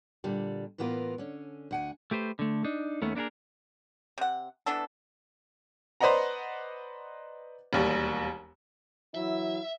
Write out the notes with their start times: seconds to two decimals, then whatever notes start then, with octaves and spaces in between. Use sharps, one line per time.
0.24 A#2 D3 G3
0.78 A2 E3 A#3 B3 F4 A#4
1.18 D3 C#4
1.71 D2 F#5 G#5
2.11 A3 G4 B4 C5
2.39 D3 A3
2.64 D4 D#4
3.02 D#2 D#3 A3 B3 C#4
3.15 A#3 D4 E4 G#4 A#4
4.18 C3 F#5
4.66 E3 B3 D4 A4
6.00 B4 C5 D5 D#5 F#5 A#5
7.73 E1 D#2 G3
9.15 E3 F#3 E4 E5